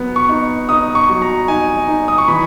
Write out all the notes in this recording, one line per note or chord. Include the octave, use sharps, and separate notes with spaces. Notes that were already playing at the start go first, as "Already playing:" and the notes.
Already playing: F#3 B3
C#6
D#4
D#4 D#6
C#6
F#3
A#5
D#4 G#5
D#4
D#6
C#6
E3 B5